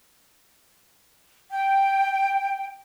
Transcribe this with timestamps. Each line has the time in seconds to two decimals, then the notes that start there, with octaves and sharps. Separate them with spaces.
1.51 G5